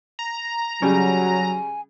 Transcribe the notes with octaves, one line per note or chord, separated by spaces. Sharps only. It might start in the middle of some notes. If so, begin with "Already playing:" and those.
A#5
C#3 F#3 G3 G#5